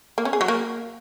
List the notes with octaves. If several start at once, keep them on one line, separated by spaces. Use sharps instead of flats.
A#3
C#4
G#4
F#3
A#3